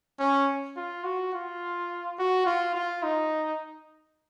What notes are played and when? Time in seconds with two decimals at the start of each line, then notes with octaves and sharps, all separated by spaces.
0.20 C#4
0.76 F4
1.04 F#4
1.34 F4
2.19 F#4
2.46 F4
2.75 F4
3.03 D#4